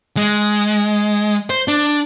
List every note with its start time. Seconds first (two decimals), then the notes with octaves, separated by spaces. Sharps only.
0.17 G#3
1.50 C5
1.68 D4